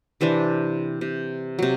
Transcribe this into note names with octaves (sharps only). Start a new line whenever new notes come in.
C3 E3 C4 D4
C3
C3 F#3